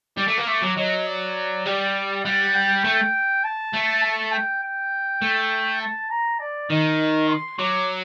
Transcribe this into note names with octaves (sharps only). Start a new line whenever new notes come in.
G3 D6
A3
A#3
A3 D6
F#3
F#3 D#5
D5
G3 D5
G3 F#5
G5
A3
A5
A3
A5
G5
G5
A3
A5
A#5
D5
D#3 D#5
C6
F#3 D6